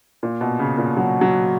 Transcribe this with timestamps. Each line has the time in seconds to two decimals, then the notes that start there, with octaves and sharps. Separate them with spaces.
0.23 A#2
0.41 B2
0.59 C#3
0.78 A#2
0.97 F#3
1.21 F#3